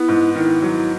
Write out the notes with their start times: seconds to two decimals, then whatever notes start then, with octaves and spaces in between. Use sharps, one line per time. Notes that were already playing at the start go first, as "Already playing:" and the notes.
Already playing: B3 E4
0.08 G#2
0.35 D#3 E4
0.62 F#3